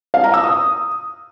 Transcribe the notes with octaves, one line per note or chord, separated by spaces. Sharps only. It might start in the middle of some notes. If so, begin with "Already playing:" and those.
F5
A#5
E6
D#6